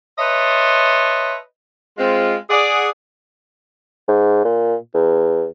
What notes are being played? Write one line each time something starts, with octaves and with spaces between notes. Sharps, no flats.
B4 C#5 D#5 E5 A5 C6
G#3 C4 F4
G#4 D5 F#5
G#2
A#2
E2